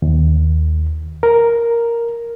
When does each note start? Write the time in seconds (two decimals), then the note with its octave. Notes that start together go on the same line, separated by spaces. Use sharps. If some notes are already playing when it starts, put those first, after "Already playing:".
0.02 D#2
1.23 A#4